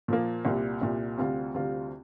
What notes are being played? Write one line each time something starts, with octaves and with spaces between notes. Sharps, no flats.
A#2 F3 A#3
C2 A#2 G3
C2 A#2 G3
D2 C3 G3 C4 F4
D2 C3 G3 C4 F4